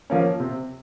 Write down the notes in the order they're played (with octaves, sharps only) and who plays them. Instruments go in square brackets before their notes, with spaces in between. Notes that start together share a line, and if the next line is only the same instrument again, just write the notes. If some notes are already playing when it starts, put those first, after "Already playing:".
[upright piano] F3 A#3 C#4
C3